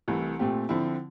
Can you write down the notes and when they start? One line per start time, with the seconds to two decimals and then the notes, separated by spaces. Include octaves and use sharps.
0.08 C2 C3 E3 A3
0.39 A#2 A3 C4 G4
0.69 D3 F3 C4 E4